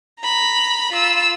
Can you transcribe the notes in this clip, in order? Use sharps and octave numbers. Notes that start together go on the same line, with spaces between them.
A#5 B5
F4 E6